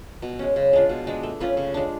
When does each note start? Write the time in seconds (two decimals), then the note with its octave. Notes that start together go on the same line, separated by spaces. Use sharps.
0.22 B2
0.39 G#3 C#4
0.56 C#3
0.73 G#3 D4 F4
0.89 B2
1.07 G#3 D4
1.23 A3
1.40 C#4 F4 B4
1.57 C#3
1.74 G#3 D4